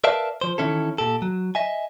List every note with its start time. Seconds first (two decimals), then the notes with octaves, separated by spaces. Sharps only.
0.04 A#4 B4 D5 E5 F5 A5
0.41 F3 C5
0.58 D#3 E3 C#4 E4 A4
0.98 A#2 G4 A4
1.22 F#3
1.55 D#5 E5 G#5